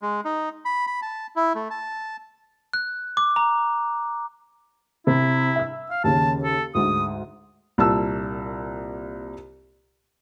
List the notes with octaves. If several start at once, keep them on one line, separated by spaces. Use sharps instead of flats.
G#3
D#4
B5
B5
A5
E4
A3
A5
F#6
D6
A#5
C3 E4
E5 E6
F5
D#2 C#3 A5
A4
D2 G#2 D#6
C2 A#2 A5 E6